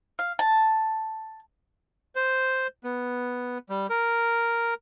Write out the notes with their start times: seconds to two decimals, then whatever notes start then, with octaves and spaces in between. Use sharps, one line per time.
0.19 F5
0.39 A5
2.16 C5
2.84 B3
3.70 G3
3.90 A#4